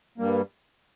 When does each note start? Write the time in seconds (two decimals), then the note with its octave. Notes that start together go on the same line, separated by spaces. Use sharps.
0.18 G2 G3 A#3